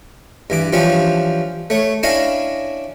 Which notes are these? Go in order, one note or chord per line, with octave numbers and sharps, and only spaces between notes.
G2 E3 D6
E3 F3 G3 C#4 D4 F4
A3 C#5
C#4 D4 E4 D#5 F5 G#5